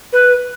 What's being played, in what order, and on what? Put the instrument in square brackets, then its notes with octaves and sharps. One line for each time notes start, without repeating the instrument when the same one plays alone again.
[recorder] B4